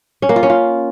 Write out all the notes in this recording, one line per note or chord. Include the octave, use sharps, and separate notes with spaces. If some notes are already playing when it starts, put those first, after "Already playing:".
C#4
A#3
F4
C#4
F4